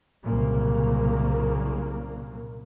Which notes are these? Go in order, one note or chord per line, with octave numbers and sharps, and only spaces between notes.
C2 A#2 C#3 F#3 A#3